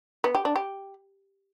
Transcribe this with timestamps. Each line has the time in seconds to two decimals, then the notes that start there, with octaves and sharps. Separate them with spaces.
0.24 B3
0.35 G4
0.45 D4
0.56 G4